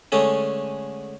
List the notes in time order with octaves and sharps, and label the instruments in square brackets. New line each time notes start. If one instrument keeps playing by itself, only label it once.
[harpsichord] D3 G#3 A3 C#4